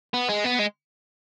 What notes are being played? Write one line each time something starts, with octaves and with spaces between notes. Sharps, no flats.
B3
G#3
B3
G#3